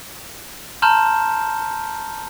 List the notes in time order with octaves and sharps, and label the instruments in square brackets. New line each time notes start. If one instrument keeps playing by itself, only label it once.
[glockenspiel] A5 A#5 C6 F6 G6 E7